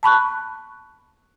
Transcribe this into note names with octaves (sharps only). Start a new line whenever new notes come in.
A5 B5 C#6 F#6